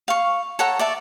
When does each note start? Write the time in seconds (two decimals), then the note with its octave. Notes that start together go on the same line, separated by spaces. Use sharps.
0.08 F5 C#6
0.59 A4 C#5 F#5 A#5
0.79 D5 E5 A5